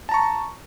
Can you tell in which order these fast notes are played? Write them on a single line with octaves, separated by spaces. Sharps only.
A5 A#5 C#6